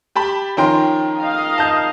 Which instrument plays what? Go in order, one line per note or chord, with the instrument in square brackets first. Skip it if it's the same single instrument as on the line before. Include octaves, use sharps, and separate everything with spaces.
[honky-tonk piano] G4 A5 B5
[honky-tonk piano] D#3 F3 A#5 [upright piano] C#4 G5 C6
[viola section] D#5 F5
[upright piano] A5 G6